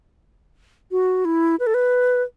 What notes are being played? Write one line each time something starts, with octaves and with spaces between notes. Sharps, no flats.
F#4
E4
B4
A4
B4